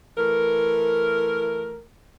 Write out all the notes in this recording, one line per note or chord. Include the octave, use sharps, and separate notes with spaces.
E3 A3 A#4